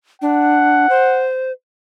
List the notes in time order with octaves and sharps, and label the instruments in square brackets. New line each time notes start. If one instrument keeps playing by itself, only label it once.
[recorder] D4 [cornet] F#5
[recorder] C5